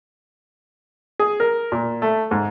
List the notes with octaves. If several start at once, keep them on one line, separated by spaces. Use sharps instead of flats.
G#4
A#4
A#2
A3
G#2